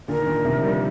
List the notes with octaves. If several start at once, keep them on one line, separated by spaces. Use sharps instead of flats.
A#2 D3 A#4
D#3
A#2 D3
C3 D#3
F3
D#3 G3